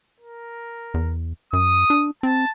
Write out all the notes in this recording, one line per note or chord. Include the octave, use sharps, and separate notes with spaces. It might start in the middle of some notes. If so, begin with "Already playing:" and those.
A#4
E2
F#2 D#6
D4
C4 A5